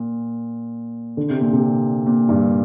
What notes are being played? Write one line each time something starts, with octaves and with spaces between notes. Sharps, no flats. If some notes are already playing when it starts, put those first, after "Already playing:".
Already playing: A#2
D3
C3
A#2
C3
A#2
G2